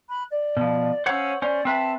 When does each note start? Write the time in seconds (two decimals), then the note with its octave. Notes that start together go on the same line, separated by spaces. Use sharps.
0.08 B5 F#6
0.30 D5
0.57 B2 F3
1.06 C#4 C5 C#5 F5 F#5 E6
1.42 C#4 C5 D5
1.65 C4 B4 E5 A5